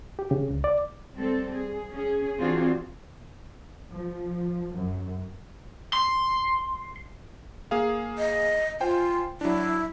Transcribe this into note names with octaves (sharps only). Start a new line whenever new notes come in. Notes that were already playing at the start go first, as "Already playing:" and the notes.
G4
C#3
C#2
D5
G3 C4 A4
G#4
C#4 G#4
E3 C4 D4 F4 F#4 G#4
F3
F#2
C6
A#3 G#4 F5
D#5
F4 C5 G5 G#5
F#3 D4 E4